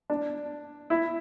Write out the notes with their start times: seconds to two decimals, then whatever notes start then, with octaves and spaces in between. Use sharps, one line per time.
0.10 D4
0.90 E4